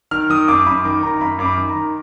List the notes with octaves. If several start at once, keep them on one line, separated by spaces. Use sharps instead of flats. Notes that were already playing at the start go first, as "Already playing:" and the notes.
D#3 F6
D#3 D#6
F#2 D6
F#2 B5
D#3 D6
D#3 A#5
A#5
F#2 B5
F#2 D6
B5
D#3
A#5
D#3